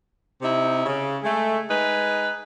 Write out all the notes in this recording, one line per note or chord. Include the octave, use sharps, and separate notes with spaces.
C3 D#4 E4
C#3
G#3 A3
G#3 D#4 B4